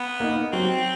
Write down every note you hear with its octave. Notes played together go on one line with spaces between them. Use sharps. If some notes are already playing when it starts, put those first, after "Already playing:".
Already playing: B3
A#3 D#4
F#3 C4